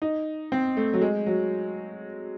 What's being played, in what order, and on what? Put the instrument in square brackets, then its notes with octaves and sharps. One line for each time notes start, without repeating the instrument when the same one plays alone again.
[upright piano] D#4
C4
A3
F#3
G#3
F#3